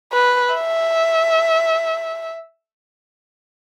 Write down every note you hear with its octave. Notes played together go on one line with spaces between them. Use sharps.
B4
E5